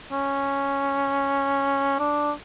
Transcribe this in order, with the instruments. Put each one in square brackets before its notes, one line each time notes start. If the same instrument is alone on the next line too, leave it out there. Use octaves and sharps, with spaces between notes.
[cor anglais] C#4
D4